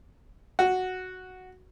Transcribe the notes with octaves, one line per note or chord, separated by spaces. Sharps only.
F#4